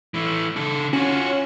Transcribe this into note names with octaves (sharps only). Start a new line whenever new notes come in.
E3 A3
C#3 A4
C#4 F4 F#4